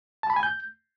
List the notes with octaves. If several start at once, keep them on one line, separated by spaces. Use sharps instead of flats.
A5
B5
G#5
G6